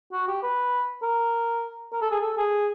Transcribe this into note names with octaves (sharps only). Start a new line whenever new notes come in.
F#4
G4
B4
A#4
A#4
A4
G#4
A4
G#4